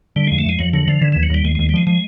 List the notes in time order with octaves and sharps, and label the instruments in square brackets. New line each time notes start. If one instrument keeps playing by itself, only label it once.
[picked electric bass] D3 [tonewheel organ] G3
[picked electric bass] F2 [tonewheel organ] G#3
[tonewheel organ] A3
[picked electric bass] F2 [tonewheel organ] G#3
[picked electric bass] F2 [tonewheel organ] F#3
[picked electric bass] D3 [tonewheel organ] F#3
[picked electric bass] D3 [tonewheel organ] F3
[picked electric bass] D3 [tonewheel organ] E3
[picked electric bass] D#2 [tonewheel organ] E3
[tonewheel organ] F#3
[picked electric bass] D#2 [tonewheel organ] G3
[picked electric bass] D#2 [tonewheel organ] G#3
[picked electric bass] D#2 [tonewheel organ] G#3
[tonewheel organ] G3
[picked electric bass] F3 [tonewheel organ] G#3
[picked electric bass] F3 [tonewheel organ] G#3